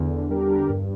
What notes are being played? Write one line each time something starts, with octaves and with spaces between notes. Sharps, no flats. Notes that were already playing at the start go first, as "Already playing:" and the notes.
Already playing: E2 D3
G3 D4 G4 A#4
G2